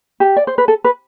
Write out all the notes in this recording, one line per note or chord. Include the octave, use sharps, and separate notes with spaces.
G4
D5
C5
B4
A4
B4